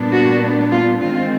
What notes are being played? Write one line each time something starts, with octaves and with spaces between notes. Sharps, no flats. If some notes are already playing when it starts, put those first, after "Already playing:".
Already playing: A#2 G3 B3 D4
F#4
F4
D#3 G#3 C4 F4